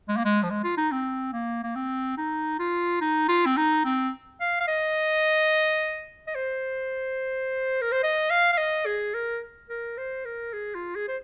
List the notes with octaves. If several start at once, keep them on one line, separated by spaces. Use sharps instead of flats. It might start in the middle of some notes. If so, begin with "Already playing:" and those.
G#3
A#3
G#3
F3
G#3
F4
D#4
C4
A#3
A#3
C4
D#4
F4
D#4
F4
C4
D#4
C4
F5
F5
D#5
D#5
C5
A#4
C5
D#5
F5
F5
D#5
G#4
A#4
A#4
C5
A#4
G#4
F4
G#4
C5